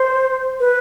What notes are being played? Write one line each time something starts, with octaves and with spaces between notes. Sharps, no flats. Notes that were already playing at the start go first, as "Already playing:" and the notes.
Already playing: C5
B4